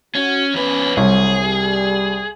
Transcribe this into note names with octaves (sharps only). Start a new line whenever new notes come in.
C#4 F#4
F2 B3 C#4 B4
C2 F#3 G#4 C#5
G3